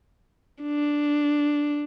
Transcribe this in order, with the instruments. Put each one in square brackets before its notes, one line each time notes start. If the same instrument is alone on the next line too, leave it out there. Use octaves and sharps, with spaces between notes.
[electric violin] D4